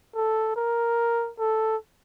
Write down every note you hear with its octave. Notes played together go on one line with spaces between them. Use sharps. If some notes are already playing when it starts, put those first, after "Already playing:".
A4
A#4
A4